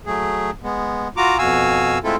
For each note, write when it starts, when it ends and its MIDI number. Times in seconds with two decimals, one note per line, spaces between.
0.06 0.51 54
0.06 0.51 57
0.06 0.51 68
0.64 1.08 56
0.64 1.08 59
1.17 1.38 65
1.17 1.38 66
1.17 1.38 82
1.17 1.38 86
1.38 1.98 41
1.38 1.98 47
1.38 1.98 66
1.38 1.98 77
1.38 1.98 80
1.38 1.98 88
2.04 2.16 56
2.04 2.16 57
2.04 2.16 60
2.04 2.16 64
2.04 2.16 65
2.04 2.16 69